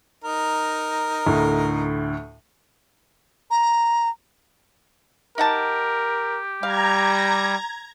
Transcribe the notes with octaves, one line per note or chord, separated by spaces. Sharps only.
D#4 A#4
D2 A2
A#5
D#4 G4 A#4 F#5 A5
G3 F5 A#5 G#6